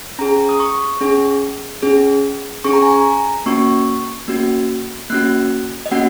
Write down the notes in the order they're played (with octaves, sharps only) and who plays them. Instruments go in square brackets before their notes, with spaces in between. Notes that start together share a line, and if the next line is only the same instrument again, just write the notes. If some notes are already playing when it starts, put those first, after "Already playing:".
[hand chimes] C#4 G#4 A#5
D#6
C#6
C#4 G#4
C#4 G#4
C#4 G#4 C#6
A#5
G#5
A#5
A#3 C#4 F#4 C#6
A#3 C#4 F#4
A#3 C#4 F#4 F#6
D#5
A#3 C#4 F#4 F#5